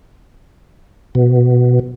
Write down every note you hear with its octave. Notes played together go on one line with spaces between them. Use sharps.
B2